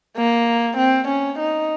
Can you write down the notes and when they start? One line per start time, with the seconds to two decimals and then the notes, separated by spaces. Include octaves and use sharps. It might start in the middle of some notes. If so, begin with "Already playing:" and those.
0.17 A#3
0.78 C4
1.08 C#4
1.39 D#4